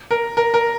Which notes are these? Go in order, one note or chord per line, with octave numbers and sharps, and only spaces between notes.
A#4
A#4
A#4